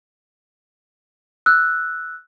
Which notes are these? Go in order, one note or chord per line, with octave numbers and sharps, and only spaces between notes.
E6 F#6